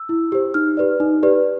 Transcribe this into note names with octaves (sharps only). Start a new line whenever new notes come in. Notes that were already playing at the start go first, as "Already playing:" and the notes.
Already playing: E6
E4
G4 C5
D#4 F6
G4 B4 D5
D#4
G4 B4 D5